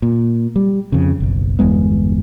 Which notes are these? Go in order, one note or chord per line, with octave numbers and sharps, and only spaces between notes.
A#2
G3
F2 C#3
F#1 B1
G1 E2 G#3 B3